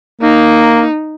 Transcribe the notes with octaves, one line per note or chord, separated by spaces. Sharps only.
A#3 D#4